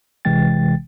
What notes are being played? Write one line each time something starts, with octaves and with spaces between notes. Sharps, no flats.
G#1 C3 E3 G#3 G5 A6